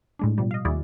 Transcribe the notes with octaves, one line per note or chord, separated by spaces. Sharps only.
A2 G#3 D4
B2 F3 G3
D#5 F5
D#2 E4 F#4 G#4 D5